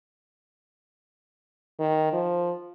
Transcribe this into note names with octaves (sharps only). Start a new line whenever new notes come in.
D#3
F3